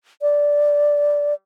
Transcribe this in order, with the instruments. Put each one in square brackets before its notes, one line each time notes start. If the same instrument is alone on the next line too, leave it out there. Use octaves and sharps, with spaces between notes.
[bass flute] D5